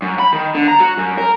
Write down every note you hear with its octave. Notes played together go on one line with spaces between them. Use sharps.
F#2
B5
D#3
D3
A#5
F#4
F#2
A#4